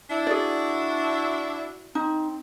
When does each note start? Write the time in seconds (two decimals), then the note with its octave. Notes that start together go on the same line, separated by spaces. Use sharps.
0.10 D4 E4
0.27 F#4 G#4 D5
1.95 C4 D#4